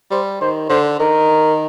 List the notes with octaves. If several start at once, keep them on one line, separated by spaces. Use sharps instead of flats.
G3 C5
D#3 C5
D3 C5
D#3 A#4